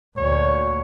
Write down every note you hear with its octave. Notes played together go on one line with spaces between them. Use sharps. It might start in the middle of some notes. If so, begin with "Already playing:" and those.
D2 A#2 C#5